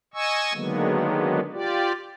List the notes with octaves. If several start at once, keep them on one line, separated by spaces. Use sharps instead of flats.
D#5 G#5 C#6 E6
D3 D#3 F#3 G#3 A#3 B3
F4 G4 D5